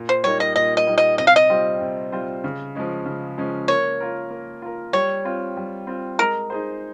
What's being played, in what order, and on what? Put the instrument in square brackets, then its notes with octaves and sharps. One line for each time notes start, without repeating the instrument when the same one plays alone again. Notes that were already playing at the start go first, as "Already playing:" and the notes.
Already playing: [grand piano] A#2
[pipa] C5
[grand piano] G3 A#3 D#4 [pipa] C#5
[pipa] D#5
[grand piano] A#2 [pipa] D#5
[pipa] D#5
[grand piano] G3 A#3 D#4
[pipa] D#5
[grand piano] C3 [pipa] D#5
[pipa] F5
D#5
[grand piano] G3 C4 F4 C5
C3
G3 C4 F4 C5
C#3
F3 G#3 C#4
C#3
F3 G#3 C#4
[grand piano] A#3 [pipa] C#5
[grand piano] F4 A#4
A#3
F4 A#4
[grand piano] G3 [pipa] C#5
[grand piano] C4 F4
G3
C4 F4
[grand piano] G#3 [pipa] A#4
[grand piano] D#4 G#4 C5